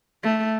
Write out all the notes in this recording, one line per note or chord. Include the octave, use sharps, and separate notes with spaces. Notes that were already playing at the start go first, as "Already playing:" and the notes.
A3